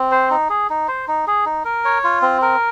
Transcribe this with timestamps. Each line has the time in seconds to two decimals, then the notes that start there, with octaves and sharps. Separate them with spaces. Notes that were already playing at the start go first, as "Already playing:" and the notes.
Already playing: C4
0.11 C5
0.31 D#4
0.50 G#4
0.70 D#4
0.88 C5
1.08 D#4
1.27 G#4
1.46 D#4
1.65 A#4
1.85 C#5
2.04 F4
2.22 C4
2.42 A#4